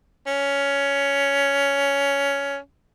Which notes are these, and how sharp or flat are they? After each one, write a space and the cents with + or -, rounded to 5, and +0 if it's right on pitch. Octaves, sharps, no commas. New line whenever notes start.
C#4 +15